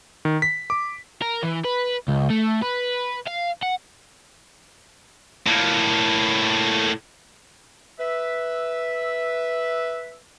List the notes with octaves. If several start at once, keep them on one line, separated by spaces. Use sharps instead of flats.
D#3
B6
D6
A#4
E3
B4
C#2
A3
B4
F5
F#5
A2 A#3
B4 E5